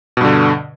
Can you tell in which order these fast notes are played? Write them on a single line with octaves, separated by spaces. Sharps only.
B2 G2 D3